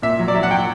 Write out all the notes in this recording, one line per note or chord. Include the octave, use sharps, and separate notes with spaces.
A#2 E5
F#3
D5
F#3 E5
F#5
F#3 G5